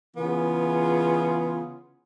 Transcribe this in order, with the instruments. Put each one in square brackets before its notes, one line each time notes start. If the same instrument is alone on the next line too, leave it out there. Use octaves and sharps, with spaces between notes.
[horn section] C#3 E3 B3 F4 G#4